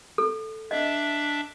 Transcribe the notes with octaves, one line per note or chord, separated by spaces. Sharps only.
A4
D4 D#5 E5